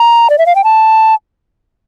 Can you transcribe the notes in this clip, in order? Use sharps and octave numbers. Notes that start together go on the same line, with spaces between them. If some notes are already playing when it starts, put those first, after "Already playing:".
Already playing: A#5
D5
E5
F5
G5
A5